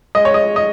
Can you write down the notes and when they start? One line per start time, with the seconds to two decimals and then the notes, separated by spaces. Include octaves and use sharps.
0.15 G#3 D#5
0.25 C#5
0.34 D#5
0.56 D#5